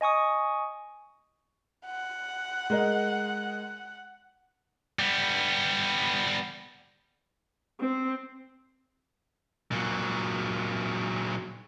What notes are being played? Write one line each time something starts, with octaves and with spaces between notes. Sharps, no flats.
D#5 G#5 C#6 D#6
F#5
G#3 A#4 D#5
G3 B3
C4
A#2 F#3